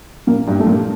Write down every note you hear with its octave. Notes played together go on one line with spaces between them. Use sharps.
A#2 A#3
G2 G3
A3
A#2 A#3